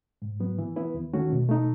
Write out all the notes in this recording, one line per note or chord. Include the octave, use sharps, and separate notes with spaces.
G#2
F#3 B3
E3
B3 E4 B4
D#2
D#3 A3 C#4 F#4
B2
A3 D#4